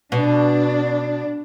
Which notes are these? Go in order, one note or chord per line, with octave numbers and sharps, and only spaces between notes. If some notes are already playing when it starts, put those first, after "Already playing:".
B2 D4